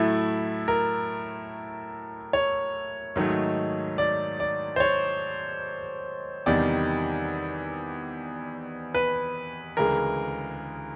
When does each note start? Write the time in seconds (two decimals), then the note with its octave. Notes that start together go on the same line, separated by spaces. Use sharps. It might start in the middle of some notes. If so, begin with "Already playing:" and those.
Already playing: A2 F#3 A3 E4
0.68 A#4
2.33 C#5
3.16 G#2 D#3 F#3 A3
3.98 D5
4.40 D5
4.76 C5
4.80 C#5
6.46 E2 C3 D#3 G3 D5
8.94 B4
9.77 D2 C#3 E3 G#3 A#4